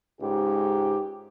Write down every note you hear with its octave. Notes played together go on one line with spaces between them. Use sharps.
C#2 G#2 G4